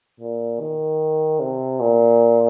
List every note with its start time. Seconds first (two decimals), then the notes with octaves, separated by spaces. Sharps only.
0.20 A#2
0.60 D#3
1.40 C3
1.80 A#2